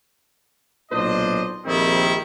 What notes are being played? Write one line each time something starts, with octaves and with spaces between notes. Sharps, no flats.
B1 A#2 D4 C5 D#5
A#1 F2 D#3 G3 C4 E4